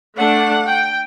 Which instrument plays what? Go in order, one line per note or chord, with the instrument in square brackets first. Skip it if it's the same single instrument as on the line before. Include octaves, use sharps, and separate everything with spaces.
[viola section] A3 D4 [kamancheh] F#5
[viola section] G5